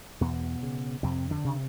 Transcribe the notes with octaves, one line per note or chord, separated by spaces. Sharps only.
E2 B2 B3
C#3
F2 C3 C4
D3 D4
C3